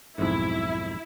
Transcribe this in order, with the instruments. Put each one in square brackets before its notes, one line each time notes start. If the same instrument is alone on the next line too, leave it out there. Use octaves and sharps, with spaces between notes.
[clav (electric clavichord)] B1 F2 G#2 [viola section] E4